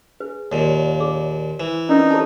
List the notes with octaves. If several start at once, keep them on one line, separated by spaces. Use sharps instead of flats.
G#4 B4
D#2 A#2 C#5 D5
G#4
E3 C5
C4 C#4 D#4 A#4 B4 D5
G4 A4 A#4 C5 C#5 A5